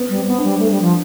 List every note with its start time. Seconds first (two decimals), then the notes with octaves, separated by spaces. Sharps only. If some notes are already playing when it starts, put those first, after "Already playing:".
Already playing: B3
0.09 G3
0.16 C4
0.27 B3 C4
0.38 D4
0.44 G3
0.59 A3
0.70 G3
0.82 F3